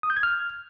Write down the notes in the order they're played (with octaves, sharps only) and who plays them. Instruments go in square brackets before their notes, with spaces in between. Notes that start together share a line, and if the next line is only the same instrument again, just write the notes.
[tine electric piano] D#6
G6
G#6
F6